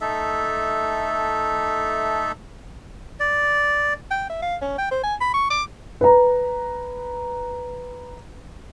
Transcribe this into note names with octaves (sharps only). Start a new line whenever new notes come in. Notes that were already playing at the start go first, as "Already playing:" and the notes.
A3 D#4 A4 E5
D5
G5
E5
F5
C#4
G5
C5
G#5
B5
C#6
D6
B4 A#5